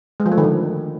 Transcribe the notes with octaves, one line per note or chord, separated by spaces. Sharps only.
G#3
F3
A3
D#3
D3